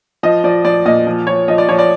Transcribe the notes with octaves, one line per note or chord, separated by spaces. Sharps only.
F3 D#5
F3 D5
F3 D5
A#2 D#5
F3
F3 C#5
F3 D#5
D5
F3 C#5
D5